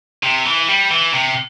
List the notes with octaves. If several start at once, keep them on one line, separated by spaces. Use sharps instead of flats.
C3
E3
G3
E3
C3